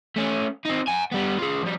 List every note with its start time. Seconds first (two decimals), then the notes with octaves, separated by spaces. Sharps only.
0.16 A3 C#4
0.65 C4 D#4
0.87 F#5 G#5
1.12 G3 B3
1.39 F4 G#4
1.63 F3 G3